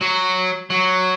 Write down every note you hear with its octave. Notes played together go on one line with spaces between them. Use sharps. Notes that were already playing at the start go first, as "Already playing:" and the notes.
F#3
F#3